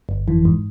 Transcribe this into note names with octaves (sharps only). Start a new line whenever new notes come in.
G1
F2 E3
G#2